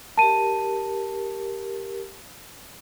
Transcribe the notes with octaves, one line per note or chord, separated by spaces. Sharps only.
G4 A#4 A5 D#7